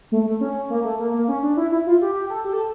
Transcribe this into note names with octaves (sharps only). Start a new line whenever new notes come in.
A3
A3
C#4
A#3
A3
A#3
A#3
C#4
D4
E4
E4
F4
G4
G4
A4
G4
A4